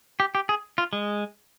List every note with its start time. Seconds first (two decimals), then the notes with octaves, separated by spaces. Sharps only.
0.20 G4
0.35 G4
0.49 G#4
0.78 F4
0.93 G#3